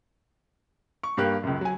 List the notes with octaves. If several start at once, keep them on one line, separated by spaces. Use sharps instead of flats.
C#6
G2 A#3 G4 F5 F#6
C#2 F#2
F#3 G#5